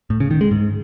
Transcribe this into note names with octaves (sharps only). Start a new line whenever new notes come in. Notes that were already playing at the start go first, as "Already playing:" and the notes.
A2
C#3
D#3
G#3
G#2